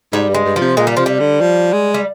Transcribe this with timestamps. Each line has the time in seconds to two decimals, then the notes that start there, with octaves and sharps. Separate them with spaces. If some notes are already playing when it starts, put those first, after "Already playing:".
0.13 G#2 G3
0.29 G2
0.34 G#3
0.45 G2
0.56 C3 F3
0.77 A#2 G#3
0.87 G3
0.97 C3 F3
1.06 G3
1.20 D3
1.41 F3
1.73 G#3
1.94 G3